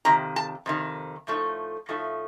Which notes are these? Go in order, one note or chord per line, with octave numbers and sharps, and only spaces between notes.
F2 C3 D#3 A#5
A5
F2 C3 D#3
A2 F3 A3 D#4
A2 F3 A3 D#4